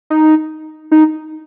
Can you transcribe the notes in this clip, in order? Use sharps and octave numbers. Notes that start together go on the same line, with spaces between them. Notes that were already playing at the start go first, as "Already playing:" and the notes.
D#4
D#4